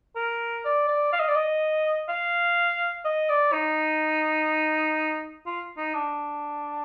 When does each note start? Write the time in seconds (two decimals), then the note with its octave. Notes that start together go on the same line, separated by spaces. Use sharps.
0.16 A#4
0.65 D5
0.88 D5
1.13 F5
1.20 D#5
1.28 D5
1.35 D#5
2.09 F5
3.05 D#5
3.30 D5
3.53 D#4
5.46 F4
5.77 D#4
5.94 D4